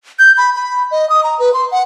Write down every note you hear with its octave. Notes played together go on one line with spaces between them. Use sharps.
G6
B5
B5
D#5
D#6
A#5
B4
C6
F#5